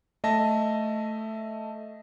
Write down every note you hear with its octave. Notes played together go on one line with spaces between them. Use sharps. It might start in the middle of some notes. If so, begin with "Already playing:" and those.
A3 D#5 E5 A5 A#6